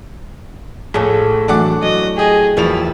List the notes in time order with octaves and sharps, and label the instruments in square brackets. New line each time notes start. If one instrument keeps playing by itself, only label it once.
[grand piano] A#1 [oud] A2 A4 [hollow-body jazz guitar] G#4 C#5
[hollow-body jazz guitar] E3 F#3 A3 [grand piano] D4 F#5 D6
[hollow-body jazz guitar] F#3 [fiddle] D#5
[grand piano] G4 D#5 [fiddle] G#4
[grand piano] E1 F3 F7 [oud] G3 A#3 F#4 [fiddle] E4